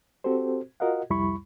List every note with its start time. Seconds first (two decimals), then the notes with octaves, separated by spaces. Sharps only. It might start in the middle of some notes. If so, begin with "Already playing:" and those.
0.24 C4 F#4 G4 A4 C5
0.80 F4 F#4 A#4 D#5 F5 F#5
1.10 C2 F2 G3 E4 B5 C#6